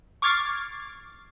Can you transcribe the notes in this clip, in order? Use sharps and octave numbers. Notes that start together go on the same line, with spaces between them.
C#6 D6 F6 G#6 A6 C7